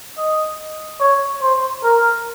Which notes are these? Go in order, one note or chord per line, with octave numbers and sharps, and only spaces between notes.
D#5
C#5
C5
A#4